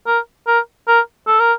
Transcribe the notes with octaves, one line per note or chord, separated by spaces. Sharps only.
A#4
A#4
A#4
A4
A#4